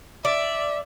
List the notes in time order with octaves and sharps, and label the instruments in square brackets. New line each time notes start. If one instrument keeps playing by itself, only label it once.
[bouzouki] D5 [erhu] E5